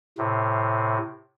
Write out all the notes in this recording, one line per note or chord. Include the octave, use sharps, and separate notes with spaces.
A2 C3